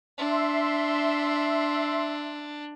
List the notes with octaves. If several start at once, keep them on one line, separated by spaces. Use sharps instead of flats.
D4 E5 C6